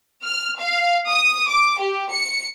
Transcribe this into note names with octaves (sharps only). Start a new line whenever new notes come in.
F6
F5
D#6
D6
G4
C#7